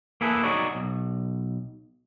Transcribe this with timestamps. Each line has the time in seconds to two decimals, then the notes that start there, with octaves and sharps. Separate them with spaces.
0.21 A#3 E4 G#4 A4 B4
0.44 D#4 F#4 G#4 C#5 D5
0.75 B1